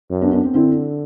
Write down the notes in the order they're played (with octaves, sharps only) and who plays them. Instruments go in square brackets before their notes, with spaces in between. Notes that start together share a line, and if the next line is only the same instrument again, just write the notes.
[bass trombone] F#2
[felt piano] B3 D4
B3 D4
C4
[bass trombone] D3 [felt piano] C4 E4